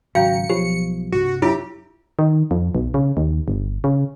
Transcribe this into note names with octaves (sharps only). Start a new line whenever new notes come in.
G#1 C#3 F#3 F#4 F5 G5 A#5 C#7
B1 F3 G4
C2 G2 F#4
F#2 E4 F4 G4 E5
D#3
F2
B1
C#3
D#2
G1
C#3